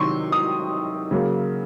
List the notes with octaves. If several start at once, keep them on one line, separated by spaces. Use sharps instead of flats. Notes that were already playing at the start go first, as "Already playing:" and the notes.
Already playing: C3 D#3 F#3 C6 C#6
D#6
C#3 F#3 A#3